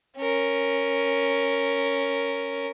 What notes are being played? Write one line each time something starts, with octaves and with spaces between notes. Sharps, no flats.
C#4 A#4